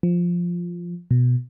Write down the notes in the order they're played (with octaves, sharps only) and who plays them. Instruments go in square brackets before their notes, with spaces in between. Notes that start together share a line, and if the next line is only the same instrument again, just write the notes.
[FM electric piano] F3
B2